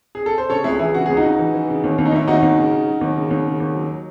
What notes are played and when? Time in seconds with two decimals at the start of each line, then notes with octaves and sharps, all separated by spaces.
0.15 G#4
0.26 A4
0.38 C5
0.50 C#3 A4 C#5
0.64 C#2 E4 G#4
0.79 E3 E4 G#4
0.94 C#3 F#4
1.06 C#2 G#4
1.17 D#4 F#4
1.24 C#3
1.39 E3
1.54 E3
1.69 C#3
1.84 D#2
1.98 D#2
2.05 D#4
2.12 D#2 E4
2.28 D#2 D#4 F#4
2.42 D#2
2.57 C#3
2.71 C#3
2.87 F#3
3.01 D#2
3.16 C#3
3.30 D#2
3.46 C#3
3.60 D#2
3.75 F#3